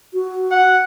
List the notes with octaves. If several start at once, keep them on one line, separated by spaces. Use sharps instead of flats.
F#4
F#5